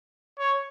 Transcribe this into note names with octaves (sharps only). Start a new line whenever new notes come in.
C#5